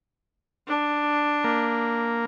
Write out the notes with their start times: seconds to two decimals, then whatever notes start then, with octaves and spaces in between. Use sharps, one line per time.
0.68 D4
1.44 A#3